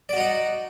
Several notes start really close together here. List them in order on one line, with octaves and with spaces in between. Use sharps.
D5 F#4 D#4 F#5